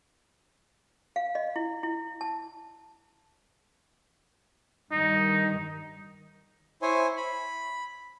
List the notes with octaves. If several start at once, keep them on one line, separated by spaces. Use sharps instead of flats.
F5
D#5
E4
E4
A5
G2 D#3 D#4
E4 C5 C#5 G#5
B5